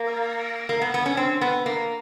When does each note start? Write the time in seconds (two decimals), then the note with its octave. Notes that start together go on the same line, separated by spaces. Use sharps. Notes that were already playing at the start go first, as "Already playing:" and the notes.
Already playing: A#3
0.69 A#3
0.81 B3
0.94 B3
1.06 C#4
1.17 C4
1.41 B3
1.66 A#3